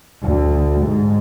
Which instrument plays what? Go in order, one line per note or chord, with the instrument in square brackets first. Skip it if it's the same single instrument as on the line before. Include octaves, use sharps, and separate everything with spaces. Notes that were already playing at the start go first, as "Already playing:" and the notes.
[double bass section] D2
G#2